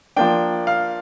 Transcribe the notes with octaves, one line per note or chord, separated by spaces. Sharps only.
F3 A#3 D4 G5
F5